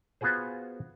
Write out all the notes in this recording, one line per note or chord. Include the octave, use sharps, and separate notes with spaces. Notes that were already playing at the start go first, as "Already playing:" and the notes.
B3 F4 F#4 G#4 C5